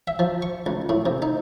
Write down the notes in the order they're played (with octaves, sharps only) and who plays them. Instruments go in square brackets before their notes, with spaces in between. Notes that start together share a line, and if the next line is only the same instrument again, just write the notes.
[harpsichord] E5
F3
C#6
C#2
A2
C3
D#4